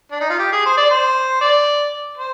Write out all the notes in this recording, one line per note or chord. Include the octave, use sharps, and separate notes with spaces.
D4
D#4
F4
G4
G#4
C5
D5
C5
D5
C5